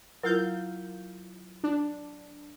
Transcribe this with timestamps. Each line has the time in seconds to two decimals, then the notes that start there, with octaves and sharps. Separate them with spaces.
0.23 F#3 E4 F4 A#4 F5 G6
1.64 D4